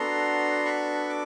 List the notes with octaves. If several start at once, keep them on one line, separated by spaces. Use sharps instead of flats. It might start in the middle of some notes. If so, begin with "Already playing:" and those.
Already playing: B3 D4 F#4 A4 A#5 C6
B5 C#6
D6